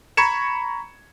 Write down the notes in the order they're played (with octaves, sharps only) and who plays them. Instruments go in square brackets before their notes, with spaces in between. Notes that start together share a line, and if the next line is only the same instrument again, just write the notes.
[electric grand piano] A#5 B5 C#6 G#6 C#7 E7